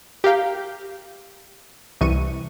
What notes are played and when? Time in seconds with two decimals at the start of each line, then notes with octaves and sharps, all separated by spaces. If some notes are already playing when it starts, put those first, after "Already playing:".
0.24 G4 A#4 F5 G5
2.01 C2 C3 E3 C#6 D#7